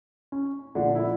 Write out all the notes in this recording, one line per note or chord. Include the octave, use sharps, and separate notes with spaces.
C#4
A#1 A#2 D3 F3 D4
E4